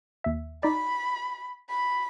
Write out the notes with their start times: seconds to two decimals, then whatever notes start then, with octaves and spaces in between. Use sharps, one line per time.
0.24 D#2 E5
0.63 D#4 D5 B5
1.69 B5